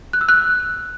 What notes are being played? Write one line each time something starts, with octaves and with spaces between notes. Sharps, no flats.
F#6
E6
F#6